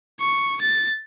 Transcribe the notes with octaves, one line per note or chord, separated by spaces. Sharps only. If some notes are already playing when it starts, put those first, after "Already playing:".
C#6
A6